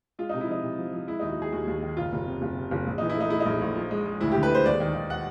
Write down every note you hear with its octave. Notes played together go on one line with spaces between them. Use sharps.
G#3 F4
C3 D#4
E4
F3 D#4
C3
F3
F3
G#3 E4
D#2 D#4
F#4
D#2 G#4
D#2 F#4
D#2
D#3
F#1 F4
F#1
C3
F#1
C3
F#1
A#1
E3 D#4
E4
A3 D#4
A3 E4
D#4
A#1
A#1
F3
G#3
G#3
D2 E4
D3 G4
B4
G#3 C5
D#2 D5
D#3
D#3
F#5